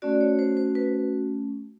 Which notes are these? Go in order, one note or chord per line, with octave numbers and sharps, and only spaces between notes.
A3 C#4 F#4 D5
C#5
C5
C5
B4